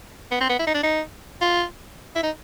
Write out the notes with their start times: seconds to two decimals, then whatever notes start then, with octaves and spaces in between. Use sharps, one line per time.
0.31 B3
0.41 C4
0.49 B3
0.59 E4
0.67 D#4
0.74 D4
0.83 D#4
1.41 F4
2.15 E4
2.23 D#4